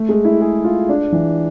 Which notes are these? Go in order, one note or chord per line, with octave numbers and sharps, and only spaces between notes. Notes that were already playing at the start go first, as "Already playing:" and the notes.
Already playing: A3
G#3
E4
G#4
F4
D4
E3